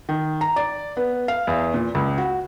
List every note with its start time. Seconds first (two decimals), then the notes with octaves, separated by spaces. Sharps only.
0.09 D#3
0.41 A#5
0.56 D5
0.97 B3
1.28 F5
1.47 E2
1.74 A#2
1.95 C#2
2.18 F#4